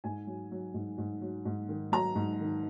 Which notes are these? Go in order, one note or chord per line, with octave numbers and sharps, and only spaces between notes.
G#2 G#5
F#3
F#3
G#2
G#2
F#3
G#2
D#3
F#3 A#5
G#2
D#3